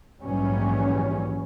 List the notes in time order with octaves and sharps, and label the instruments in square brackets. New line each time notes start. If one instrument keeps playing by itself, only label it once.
[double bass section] A#1 G#2 E3 F#3 G3 C#4